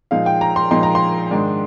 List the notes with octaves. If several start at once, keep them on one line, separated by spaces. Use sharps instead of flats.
A#2 F3 G#3 D#4 F5
G5
A#5
C6
A#2 F3 G#3 D#4 C6
A#5
C6
G#2 D#3 G#3 D4